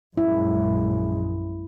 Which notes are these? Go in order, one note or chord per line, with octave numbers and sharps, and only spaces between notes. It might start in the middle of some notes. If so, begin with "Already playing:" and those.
A#1 F#2 G#3 E4